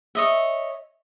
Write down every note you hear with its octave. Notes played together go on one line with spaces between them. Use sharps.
C#5 D#5 E5